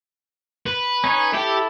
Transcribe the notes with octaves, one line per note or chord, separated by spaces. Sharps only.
B4
C#4 D#4 C#5
E4 G4 A4